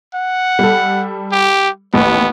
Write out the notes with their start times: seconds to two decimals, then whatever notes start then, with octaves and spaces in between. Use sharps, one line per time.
0.14 F#5
0.59 G3 A4
1.32 G4
1.94 A1 D#2 B3